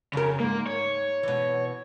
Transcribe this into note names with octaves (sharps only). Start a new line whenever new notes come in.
F2 C#3 A#4
G#2 A#3 A#4
C#5
B2 E3